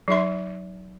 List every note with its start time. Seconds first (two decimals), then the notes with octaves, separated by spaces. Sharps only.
0.08 F#3 D#4 E5 C6